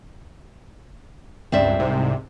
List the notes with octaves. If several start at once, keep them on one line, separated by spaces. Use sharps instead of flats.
C#2 G2 C4 D5 E5
C2 G#2 C3